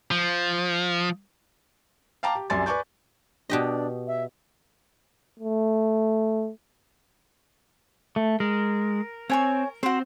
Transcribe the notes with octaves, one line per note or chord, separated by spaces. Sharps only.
F3
F5 G5 A5 A#5 D6
G4
C2 F#2 D5 G#5 C6 A6
B4 D5 G#5 C#6 D6 G6
B2 D4 G4 D#5
E5
A3
A3
G#3 A#4
C4 C#5 G#5 C#6
C4 F#4 C5